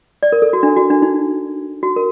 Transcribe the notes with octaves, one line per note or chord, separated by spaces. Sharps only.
D5
A#4
A4
F#4
D4
F#4
D4
D#4
F#4
A#4